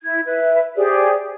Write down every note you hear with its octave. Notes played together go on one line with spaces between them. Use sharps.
E4 G#6
B4 E5
G4 G#4 C5 D5